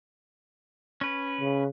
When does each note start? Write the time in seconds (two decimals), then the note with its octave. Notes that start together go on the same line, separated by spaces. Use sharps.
1.01 C#4 B4
1.41 C#3